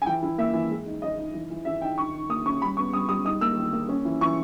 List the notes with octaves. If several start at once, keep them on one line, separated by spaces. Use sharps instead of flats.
G#5
E3 G5
E4
A#3 E5
E3
G#3
D#4
D#4 D#5
D#4
E3
E3
E3 E5
D#4 G5
D#3 C#6
D#3
A#3 D#6
C#4 C#6
G3 B5
B3 C#6
G3 D#6
G3 D#6
D#4 D#6
A#3 E6
D#3
A#3
C#4
E3
E3 C#6